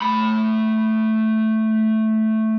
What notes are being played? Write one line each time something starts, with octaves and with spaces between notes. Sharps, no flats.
A3 B5